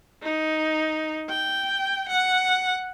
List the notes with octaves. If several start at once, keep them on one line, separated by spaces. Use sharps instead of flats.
D#4
G5
F#5